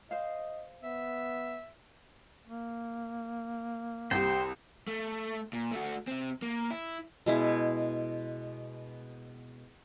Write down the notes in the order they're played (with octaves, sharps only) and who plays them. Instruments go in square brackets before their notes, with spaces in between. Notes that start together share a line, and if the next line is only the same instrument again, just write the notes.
[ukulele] C5 F5 [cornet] D#5
[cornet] B3 [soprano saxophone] E5
[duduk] A#3
[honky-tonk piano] C2 G4 [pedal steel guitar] C5 G5
[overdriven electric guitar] A3
A#2
A3 F#4
C3 C4
A#3
E4
[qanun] B2 G#3 E4